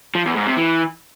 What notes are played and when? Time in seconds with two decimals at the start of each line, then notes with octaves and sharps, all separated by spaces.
0.15 F3
0.25 E2
0.36 G#2
0.46 C3
0.57 E3